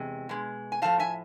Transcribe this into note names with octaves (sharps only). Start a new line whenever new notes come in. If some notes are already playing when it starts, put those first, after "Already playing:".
Already playing: E2 C3 G#3
B2 G#3
G#5
A2 F3 A3 F5 A5
E5 G#5